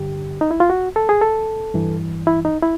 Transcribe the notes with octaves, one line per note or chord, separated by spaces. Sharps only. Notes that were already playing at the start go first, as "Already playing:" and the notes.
Already playing: G2 D3 G4
D#4
E4
F4
F#4
A4
G#4
A4
G2 E3
E4
D#4
E4